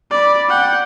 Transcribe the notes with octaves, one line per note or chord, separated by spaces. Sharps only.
D5 B5
F#5 G5